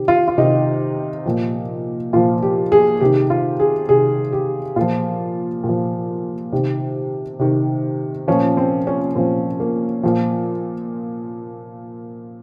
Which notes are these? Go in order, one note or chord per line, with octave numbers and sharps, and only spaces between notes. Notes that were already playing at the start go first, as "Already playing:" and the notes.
Already playing: C3 D#3 G4
F4
F4
C3 D#3 D#4
A#2 F3
A#2 F3 F4
G4
G#4
C3 D#3 G4
F4
G#4
C3 D#3 G#4
G4
A#2 F3 F4
A#2 F3
C3 D#3
C3 D#3
A#2 F3 C#4
C4
C#4
A#2 F3 C4
A#3
A#2 F3